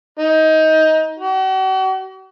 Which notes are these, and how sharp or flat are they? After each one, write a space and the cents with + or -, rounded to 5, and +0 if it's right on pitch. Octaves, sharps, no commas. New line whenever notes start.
D#4 +20
F#4 +45